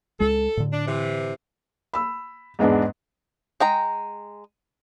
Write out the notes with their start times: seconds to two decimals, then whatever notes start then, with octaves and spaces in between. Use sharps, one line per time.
0.20 C#2 G#3 A4
0.57 A2 D3
0.72 D4
0.87 C3 E3
1.94 B5 E6
2.59 E2 G#2 G#3 B3 D4
3.60 G#3 G5 A#5